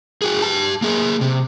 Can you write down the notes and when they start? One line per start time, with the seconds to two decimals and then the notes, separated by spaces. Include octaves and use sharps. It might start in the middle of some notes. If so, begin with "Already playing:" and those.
0.22 F#4 G#4
0.42 G4 A5
0.82 A#3 G#4
1.21 C3